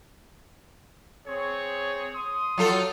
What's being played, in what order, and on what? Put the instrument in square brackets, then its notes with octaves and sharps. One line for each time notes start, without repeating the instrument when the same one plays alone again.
[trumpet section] C4 G#4 C#5
C6 D#6
[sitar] F#3 F4 A4